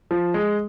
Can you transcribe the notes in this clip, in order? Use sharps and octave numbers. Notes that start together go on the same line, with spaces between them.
F3
G#3